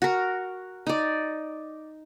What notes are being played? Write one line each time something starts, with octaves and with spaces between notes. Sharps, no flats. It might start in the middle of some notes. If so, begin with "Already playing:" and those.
F#4 A#4
D#4 D5